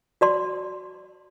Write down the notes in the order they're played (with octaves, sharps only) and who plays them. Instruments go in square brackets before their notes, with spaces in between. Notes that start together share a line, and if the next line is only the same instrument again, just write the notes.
[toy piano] F#4 D5 C6